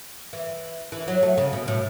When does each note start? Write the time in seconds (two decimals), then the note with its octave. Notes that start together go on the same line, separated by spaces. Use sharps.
0.33 E3
0.92 E3
1.08 F#3
1.23 A3
1.38 C#3
1.53 B2
1.68 A2